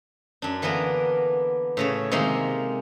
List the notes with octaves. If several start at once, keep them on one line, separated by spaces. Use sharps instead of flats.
F#2 D4
D3 E3 A#3 B3 A#4
A2 C#3 C#5
C3 D#3 G#3 A#3